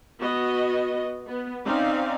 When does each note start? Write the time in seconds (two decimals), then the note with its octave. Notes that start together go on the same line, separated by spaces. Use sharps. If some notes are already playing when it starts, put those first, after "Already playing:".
0.19 B3 F#4 D#5
1.27 B3
1.66 C4 C#4 D#4 D5 F5